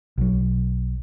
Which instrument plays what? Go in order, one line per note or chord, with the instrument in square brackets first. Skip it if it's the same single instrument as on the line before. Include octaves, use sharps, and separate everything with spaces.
[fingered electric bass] B1 F#3